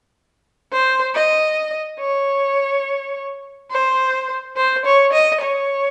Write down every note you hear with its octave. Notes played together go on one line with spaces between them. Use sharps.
C5
D#5
C#5
C5
C5
C#5
D#5
C#5